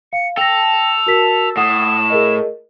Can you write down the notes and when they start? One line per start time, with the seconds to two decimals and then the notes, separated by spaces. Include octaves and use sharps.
0.13 F5 C#7
0.37 A4 G5 A#6 F7
1.06 F#4 A#4 B6
1.57 A2 F#5 D#6 E7
2.10 G#4 A#4 D#5